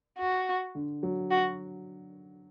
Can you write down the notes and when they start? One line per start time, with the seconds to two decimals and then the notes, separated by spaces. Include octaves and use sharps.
0.18 F#4
0.75 D3
1.03 F#3
1.31 F#4